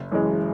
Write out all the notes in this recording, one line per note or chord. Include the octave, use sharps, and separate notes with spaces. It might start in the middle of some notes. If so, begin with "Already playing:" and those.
Already playing: F#1
F#2 E3 G#3